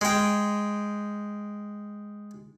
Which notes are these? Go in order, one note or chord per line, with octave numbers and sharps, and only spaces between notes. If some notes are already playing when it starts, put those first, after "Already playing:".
G#3 G5